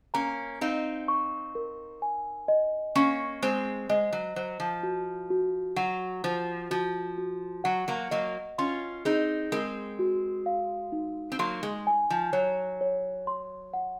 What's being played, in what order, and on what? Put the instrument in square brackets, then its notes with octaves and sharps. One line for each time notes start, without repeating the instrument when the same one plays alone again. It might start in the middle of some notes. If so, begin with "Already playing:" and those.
[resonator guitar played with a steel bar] A#3 C#4 [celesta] A#5
[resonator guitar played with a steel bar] C4 D#4 [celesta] F5
[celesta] C#6
A#4
G#5
D#5
[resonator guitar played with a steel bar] A#3 C#4 [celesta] C#6
[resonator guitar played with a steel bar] G#3 C4 [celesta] C5
[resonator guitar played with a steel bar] G#3 [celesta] D#5
[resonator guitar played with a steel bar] F#3
[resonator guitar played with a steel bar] F#3 [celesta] C5
[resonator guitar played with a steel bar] F3
[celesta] F#4
F#4
[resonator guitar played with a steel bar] F#3 [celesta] F#5
[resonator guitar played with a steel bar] F3 [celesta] C5
[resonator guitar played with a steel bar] F3 [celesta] F#4
[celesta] F#4
[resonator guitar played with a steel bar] F#3 [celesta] F#5
[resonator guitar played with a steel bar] F#3 A#3
[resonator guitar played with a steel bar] F#3 A#3 [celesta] D#5
[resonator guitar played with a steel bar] C#4 F4 [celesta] C6
[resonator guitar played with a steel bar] C4 D#4 [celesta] G#4
[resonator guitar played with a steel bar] G#3 C4 [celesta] A#4
[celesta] F#4
F5
D#4
[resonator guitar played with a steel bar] C4
[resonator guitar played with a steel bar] F#3 A#3 [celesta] C6
[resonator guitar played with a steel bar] G#3
[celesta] G#5
[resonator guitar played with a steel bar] F3
[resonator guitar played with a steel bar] F#3 [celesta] C#5
[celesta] C#5
C6
F#5